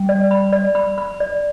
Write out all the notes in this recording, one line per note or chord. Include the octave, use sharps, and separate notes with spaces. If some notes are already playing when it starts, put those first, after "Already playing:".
Already playing: G3 G5
D5
B5
D5
B5
B5
D5